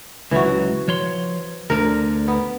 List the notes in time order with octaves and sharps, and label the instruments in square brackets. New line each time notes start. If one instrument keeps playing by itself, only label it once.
[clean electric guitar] C#2 F#3 [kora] E3 F#4
[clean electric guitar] F3 C#5 C6
[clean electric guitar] D2 D3 [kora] A#4
[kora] B3